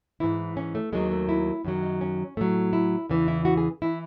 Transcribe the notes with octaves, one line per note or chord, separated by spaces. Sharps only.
G#2 E3 E4
C#4
A3
D#2 D#3 F#3 G#3
A3
E4
F#2 D#3 F#3
D#4
C#4
A2 F#3 A3
E4
E2 C#3 E3
E4
F#4
G#4
E3 E4